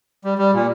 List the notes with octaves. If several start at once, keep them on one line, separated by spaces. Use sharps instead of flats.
G3
G3
A#2